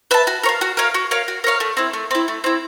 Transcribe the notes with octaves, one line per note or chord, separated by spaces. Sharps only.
B4 E5 A5
F#4
A#4 C#5
F5
F#4
A#4 C#5 F5
F#4
A#4 C#5 F5
F#4
A#4 C#5 F5
A3
C4 E4
A3
C4 E4
A3
C4 E4